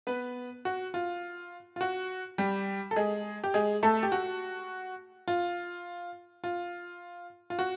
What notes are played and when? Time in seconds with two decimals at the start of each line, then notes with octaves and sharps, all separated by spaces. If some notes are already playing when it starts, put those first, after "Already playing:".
0.07 B3 B4
0.65 F#4
0.94 F4
1.76 F4
1.81 F#4
2.38 G3 G4
2.91 A4
2.96 G#3 G#4
3.44 G4
3.54 G#3 G#4
3.83 A3 A4
4.03 G4
4.12 F#4
5.28 F4
6.44 F4
7.50 F4
7.59 F#4